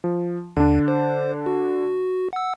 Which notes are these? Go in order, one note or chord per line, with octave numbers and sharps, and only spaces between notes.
F3
D#2 D3 D4
C5
F#4
F#5 E6